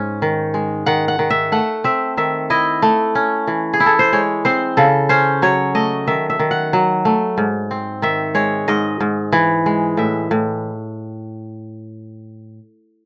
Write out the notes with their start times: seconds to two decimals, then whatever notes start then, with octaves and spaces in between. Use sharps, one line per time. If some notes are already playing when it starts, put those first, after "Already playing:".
Already playing: G#2 C#4
0.22 D#3
0.54 G#3
0.86 D#3 F#5
1.08 F#5
1.19 D#3
1.30 E5
1.52 A3 F#5
1.84 C4 E5
2.17 D#3 E5
2.50 E4 D#5
2.82 A3
3.15 C#4
3.47 E3
3.73 G#4
3.80 E4
3.86 A4
3.99 C5
4.13 G#3 C#5
4.45 C4 C5
4.77 C#3 A4
5.09 C#4 C5
5.42 F#3 C#5
5.75 A3 D#5
6.07 D#3 E5
6.30 E5
6.39 D#3
6.51 F#5
6.73 F#3
7.05 A3
7.38 G#2
7.71 C4
8.02 D#3 E5
8.35 G#3 C#5
8.68 G#2 D#5
9.00 G#2
9.32 E3
9.66 G#3
9.97 A2 E5
10.31 A2